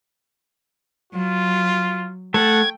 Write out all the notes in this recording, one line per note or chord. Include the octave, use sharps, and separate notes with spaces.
F#3 F4
A3 A4 F#5 G5 A5 G#6